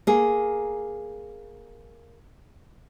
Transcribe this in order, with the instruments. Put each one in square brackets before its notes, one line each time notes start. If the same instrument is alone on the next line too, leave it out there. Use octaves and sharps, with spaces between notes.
[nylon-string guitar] A#3 G#4